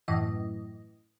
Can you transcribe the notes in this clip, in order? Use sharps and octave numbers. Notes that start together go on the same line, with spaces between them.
F#2 A2 E3 D#5